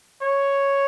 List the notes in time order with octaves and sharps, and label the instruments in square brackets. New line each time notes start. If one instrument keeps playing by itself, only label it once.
[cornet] C#5